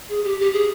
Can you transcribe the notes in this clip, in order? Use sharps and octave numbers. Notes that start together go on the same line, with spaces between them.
G#4
G4
G4
G#4